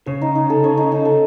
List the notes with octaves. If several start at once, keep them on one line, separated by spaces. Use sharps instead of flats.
C#3 C#5
D#4
D#4
A4
C#5
D#4
D#4
A4